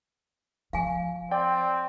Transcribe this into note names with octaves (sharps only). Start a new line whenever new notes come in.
F3 F5 G#5
C4 D5 G5